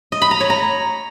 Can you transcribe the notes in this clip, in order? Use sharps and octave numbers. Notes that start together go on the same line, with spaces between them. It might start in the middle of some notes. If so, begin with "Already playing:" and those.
D#5
B5
A#5
C#5
A#5